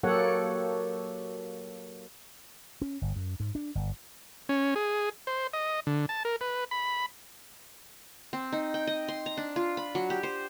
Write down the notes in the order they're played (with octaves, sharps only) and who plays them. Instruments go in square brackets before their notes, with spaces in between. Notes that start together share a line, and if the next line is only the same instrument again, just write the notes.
[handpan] F#3 A#3 G4 A4 C#5 F#5
[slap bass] C#4
G1
F#2
G#2
D4
G1
[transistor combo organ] C#4
G#4
C5
D#5
D3
A5
A#4
B4
B5
[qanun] C4
D#4
G5
D#5
C6
A#5
D4
F4
B5
F#3
G4
C5